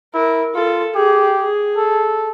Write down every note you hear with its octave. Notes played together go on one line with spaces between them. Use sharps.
E4 A#4
F4 A4
G4 G#4
G#4
A4